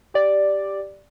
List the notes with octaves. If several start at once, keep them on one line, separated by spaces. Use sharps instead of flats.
G4 D5